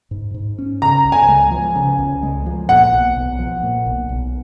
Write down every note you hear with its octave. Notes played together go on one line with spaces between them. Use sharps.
G#2
G#2
C#4
C#3 A#5
C#2
G#5
G#3
F3
C#3
C#2
G#3
F3
A#2 F#5
B1
B1
F3
A#2
B1
B1